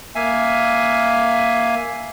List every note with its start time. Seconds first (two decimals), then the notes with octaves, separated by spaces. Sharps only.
0.15 A#3 E5 F5 G#5